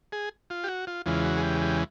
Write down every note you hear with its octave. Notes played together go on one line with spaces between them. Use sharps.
G#4
F4
G4
F#4
F4
E2 C#3 E3 G#3 F4
F#4
G#4
G4
G4